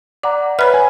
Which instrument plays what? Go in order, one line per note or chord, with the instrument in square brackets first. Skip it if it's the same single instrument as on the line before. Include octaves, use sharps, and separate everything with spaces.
[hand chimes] D5 F#5 A#5 [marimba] D6
[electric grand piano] B4 [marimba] C#5 B5 F6 [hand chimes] E5
[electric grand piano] G#5